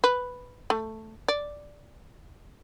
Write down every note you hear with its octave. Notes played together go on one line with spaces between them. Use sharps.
B4
A3
D5